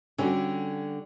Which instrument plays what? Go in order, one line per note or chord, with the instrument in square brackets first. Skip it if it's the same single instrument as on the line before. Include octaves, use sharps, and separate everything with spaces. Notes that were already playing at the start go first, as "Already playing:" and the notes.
[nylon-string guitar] D3 G3 [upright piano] C#4 F#4